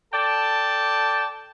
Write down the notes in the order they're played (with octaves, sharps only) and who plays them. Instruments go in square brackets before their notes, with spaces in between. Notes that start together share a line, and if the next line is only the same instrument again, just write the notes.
[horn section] A4 D5 G5 A5